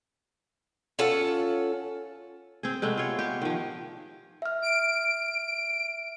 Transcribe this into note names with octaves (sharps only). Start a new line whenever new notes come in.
C#4 F4 A4 F#5
C4 G#4
C3 G#3 A3 B3
F4 C#5
G4
D#3 F3
E5 F6
D7